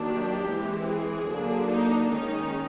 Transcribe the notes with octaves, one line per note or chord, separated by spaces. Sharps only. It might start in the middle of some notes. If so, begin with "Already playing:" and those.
Already playing: D#3 F#3 A#3 D4
G4
E3 G#3 C4
G#4
D3 F#3 A#3 D4
D#4
D#3 G#3 C#4 D#4